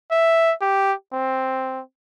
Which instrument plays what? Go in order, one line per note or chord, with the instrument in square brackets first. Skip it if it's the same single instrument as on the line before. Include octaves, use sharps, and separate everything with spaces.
[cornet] E5
G4
C4